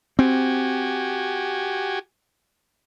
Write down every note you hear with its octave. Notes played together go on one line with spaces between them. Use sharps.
C4 F#4 G4 G#5